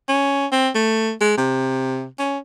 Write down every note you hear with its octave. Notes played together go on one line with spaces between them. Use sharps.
C#4
C4
A3
G#3
C3
C#4